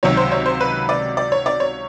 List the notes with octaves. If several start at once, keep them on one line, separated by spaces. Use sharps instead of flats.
C#2 C3 D#3 F#3 C#5
C5
C#5
C5
B4
D5
D5
C#5
D5
C#5